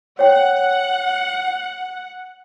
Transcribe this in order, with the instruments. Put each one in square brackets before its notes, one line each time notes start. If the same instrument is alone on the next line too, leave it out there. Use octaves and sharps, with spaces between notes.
[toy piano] C#5 G5 [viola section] F#5